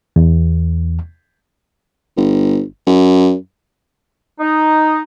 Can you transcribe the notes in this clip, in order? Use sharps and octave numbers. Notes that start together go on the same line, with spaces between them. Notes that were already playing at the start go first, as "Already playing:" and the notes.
E2
G1
F#2
D#4